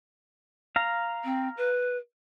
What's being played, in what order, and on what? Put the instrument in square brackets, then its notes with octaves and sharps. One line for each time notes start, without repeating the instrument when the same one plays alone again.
[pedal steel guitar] F5 A#5
[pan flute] C4
B4